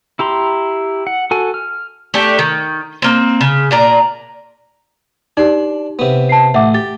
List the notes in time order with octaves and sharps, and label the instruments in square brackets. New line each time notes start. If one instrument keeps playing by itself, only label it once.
[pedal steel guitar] E4 G4 A#5 C6
F#5
F#4 A4 G#5
F6
[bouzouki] A3 D4 G4
D#3
A#3 C4
C#3
A#2 D4 A#5
[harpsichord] D4 [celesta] D#4 G4
[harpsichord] C3 B3
[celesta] A5 C7
[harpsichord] A1 [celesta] E5 F#5 D6
[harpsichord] G4 [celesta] A6